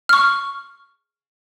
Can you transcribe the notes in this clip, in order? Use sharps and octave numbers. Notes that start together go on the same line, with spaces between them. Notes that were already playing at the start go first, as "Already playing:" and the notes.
C#6 F6